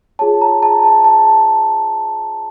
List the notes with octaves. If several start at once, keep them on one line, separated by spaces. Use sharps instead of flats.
F4 G#4 C#5 A5
A#5
A5
A5
A5